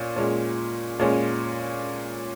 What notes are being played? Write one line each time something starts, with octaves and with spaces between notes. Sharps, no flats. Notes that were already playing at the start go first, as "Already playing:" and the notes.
Already playing: A#2 C#4
A#2 G#3 C#4
A#2 G#3 C#4